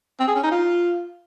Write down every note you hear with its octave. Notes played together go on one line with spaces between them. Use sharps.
C4
G#4
C#4
D#4
F4